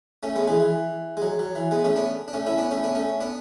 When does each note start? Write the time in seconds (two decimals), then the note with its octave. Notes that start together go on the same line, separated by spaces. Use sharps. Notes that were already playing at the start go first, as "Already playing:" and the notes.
0.23 A3 C#4
0.35 G#3 B3
0.48 E3 G#3
0.60 E3
1.17 G#3
1.22 F#3
1.39 F#3
1.55 E3
1.71 G#3 B3
1.84 A3 C#4
1.96 B3 D4
2.28 D4
2.33 A3 C#4
2.46 C#4 E4
2.58 B3 D4
2.71 A3 C#4
2.83 B3 D4
2.95 A3 C#4
3.20 B3 D4